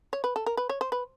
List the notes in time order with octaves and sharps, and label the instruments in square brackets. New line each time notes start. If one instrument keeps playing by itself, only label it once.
[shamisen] C#5
B4
A4
A#4
B4
C#5
C5
B4